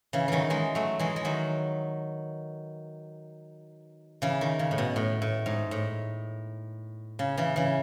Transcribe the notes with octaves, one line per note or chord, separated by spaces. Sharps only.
C#3 E3
D#3 E3 F#3
E3 G#3
F#3 A3
E3 G#3
G#3
D#3 F#3
C#3 E3
D#3
C#3
A2
B2
A2
A2
G#2
A2
C#3
C#3 E3
C#3 E3